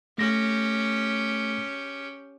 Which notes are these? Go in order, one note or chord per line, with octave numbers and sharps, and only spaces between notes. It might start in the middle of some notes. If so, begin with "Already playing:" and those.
A3 C#4 G4 A#6